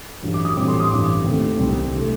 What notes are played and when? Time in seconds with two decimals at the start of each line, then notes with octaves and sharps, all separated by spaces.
0.23 A1 G2 F#3
0.34 D6
0.45 D#6
0.57 A1 A2 G3 C4 D6
0.68 C6
0.80 D#6
0.91 A1 G2 D3 D6
1.24 D#2 D3 A3 C4
1.59 C2 C3 G3 C4
1.95 D3 A3